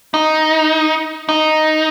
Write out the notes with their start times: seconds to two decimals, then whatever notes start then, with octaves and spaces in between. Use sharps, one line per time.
0.14 D#4
1.29 D#4